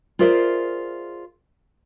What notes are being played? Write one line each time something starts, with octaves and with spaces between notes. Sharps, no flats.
F4 G#4 A#4 C5 D5 E5